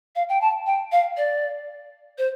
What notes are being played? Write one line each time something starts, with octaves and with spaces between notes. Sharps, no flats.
F5
G5
A5
G5
F5
D5
C5